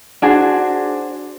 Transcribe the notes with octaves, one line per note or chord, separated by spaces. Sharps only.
D4 F#4 G#4 C5